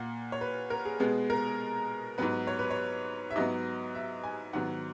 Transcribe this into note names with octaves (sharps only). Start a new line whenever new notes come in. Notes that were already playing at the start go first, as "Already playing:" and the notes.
Already playing: A#2 A#3 F#5
C#5
B4
A#4
G#4
B2 G#3 B3 G#4
A#4
G#2 F#3 B3 B4
C#5
B4
C#5
E5
G#2 F#3 B3 D#5
E5
G#5
G#2 D#3 F#3 B3 F#5